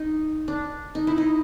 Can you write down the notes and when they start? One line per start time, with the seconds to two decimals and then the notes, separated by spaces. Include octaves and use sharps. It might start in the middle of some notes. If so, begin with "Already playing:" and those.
Already playing: D#4
0.48 D4
0.95 D#4
1.07 E4
1.18 D#4